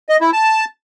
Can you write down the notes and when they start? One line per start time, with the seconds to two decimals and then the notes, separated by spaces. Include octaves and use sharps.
0.09 D#5
0.21 E4
0.33 A5